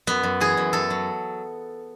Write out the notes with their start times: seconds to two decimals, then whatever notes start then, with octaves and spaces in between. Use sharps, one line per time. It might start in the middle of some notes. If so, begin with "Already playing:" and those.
0.07 F#2 B3
0.23 F#2
0.41 E3 G#4
0.57 F#2
0.73 F#2 A4
0.90 F#3